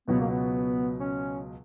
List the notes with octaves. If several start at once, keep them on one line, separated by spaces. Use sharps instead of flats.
C#2 B2 F#3 B3
A#3
B3
C#4